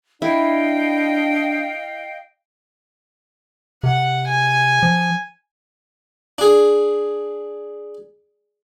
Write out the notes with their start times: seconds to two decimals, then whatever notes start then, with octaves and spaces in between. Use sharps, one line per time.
0.22 D4 E4 D#5 F5 G5
3.83 C3 F#5
4.27 G#5
4.83 F3
6.38 D4 G#4